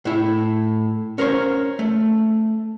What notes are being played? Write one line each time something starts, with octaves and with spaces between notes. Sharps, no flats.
A2 E4
C#4 A#4 C5 C#5
A3